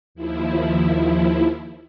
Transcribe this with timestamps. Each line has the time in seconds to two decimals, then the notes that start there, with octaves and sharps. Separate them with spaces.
0.15 D#2 F3 E4